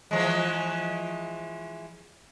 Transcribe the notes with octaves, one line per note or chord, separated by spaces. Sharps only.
E3 F3 G#3